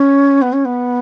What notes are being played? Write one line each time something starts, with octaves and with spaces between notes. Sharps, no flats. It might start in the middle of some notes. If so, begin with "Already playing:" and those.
Already playing: C#4
B3
C#4
B3